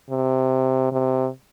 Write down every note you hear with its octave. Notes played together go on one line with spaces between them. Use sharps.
C3
C3